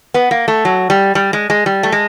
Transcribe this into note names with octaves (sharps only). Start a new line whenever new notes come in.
B3
A#3
A3
F#3
G3
G3
G#3
G#3
G3
A3
G#3